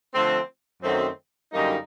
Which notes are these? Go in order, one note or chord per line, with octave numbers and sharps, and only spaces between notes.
D3 F3 A3 C4
F#2 D#3 F#3 A3 C4
F#2 D3 G3 A#3 D#4